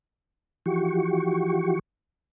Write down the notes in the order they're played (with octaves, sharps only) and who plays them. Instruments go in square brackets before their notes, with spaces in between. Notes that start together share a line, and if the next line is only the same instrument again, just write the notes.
[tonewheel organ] E3 F3 F#4 G4 C#6